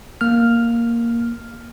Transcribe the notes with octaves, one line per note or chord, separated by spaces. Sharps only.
A#3 F6